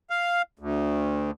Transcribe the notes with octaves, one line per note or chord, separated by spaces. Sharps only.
F5
D2